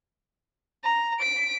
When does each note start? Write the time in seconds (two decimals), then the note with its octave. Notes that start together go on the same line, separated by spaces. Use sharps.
0.84 A#5
1.19 B6 D7